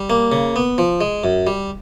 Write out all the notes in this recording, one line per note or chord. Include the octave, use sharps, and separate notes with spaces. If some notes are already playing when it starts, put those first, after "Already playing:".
Already playing: G3
A#3
C#3
B3
F3
G#3
F#2
G3